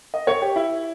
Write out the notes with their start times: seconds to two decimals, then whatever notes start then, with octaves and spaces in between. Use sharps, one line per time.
0.14 D#5
0.27 C#5
0.42 G4
0.56 E4